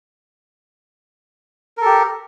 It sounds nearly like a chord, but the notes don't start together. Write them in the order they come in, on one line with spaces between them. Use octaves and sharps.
A#4 A4 G4